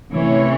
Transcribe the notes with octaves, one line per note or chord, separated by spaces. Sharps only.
C3 E3 A3 C#4 C#5